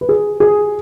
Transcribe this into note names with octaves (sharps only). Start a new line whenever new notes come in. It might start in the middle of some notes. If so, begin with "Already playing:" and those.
B4
G#4
G#4